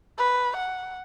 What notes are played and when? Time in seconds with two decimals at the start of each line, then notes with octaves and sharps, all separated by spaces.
0.18 B4
0.57 F#5